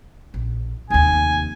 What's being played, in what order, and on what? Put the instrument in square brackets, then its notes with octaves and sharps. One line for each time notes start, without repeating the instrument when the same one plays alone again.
[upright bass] A#1
[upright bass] F1 D#2 [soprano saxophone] G#5